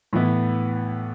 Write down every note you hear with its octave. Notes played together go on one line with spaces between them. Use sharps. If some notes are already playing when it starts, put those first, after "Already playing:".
A2 E3 B3 E4